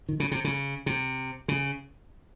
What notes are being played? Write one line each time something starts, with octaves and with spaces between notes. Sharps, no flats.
D#3
C#3
C3
C#3
C3
C#3